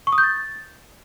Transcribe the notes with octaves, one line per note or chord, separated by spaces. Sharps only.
C#6
D#6
G6
A6